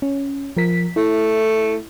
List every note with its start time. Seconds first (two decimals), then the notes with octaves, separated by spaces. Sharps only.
0.02 C#4
0.57 F3 A#4 B6
0.96 A3 E4